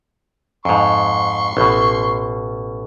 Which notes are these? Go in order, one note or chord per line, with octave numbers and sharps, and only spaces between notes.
F2 G#2 C6 C#6
A1 B2